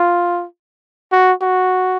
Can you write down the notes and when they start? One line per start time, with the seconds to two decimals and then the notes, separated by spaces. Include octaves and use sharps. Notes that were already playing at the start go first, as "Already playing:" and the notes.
Already playing: F4
1.12 F#4
1.41 F#4